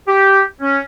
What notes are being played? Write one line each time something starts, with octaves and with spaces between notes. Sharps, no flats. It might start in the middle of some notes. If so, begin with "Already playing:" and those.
G4
C#4